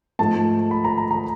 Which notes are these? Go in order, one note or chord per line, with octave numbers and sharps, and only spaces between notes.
G#2 F3 A3 A5
B5
A#5
A#5
A#5